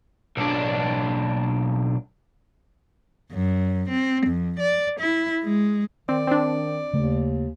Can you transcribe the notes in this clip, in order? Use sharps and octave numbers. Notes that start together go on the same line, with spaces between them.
B1 D4
F#2
C4
F2
D5
E4
G#3
D#3 C4 D5
C4 D4
D#2 C#3 A3